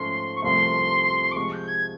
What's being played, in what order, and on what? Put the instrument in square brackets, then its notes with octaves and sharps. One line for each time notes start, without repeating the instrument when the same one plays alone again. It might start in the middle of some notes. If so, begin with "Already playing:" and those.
Already playing: [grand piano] G#2 F3 A3 C#4 [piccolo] C6
[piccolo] C#6
[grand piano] C2 C3 F3 A3 [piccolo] C6
[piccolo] D6
[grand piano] C3 F3 G#3 [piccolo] C#6
[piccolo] G6
G#6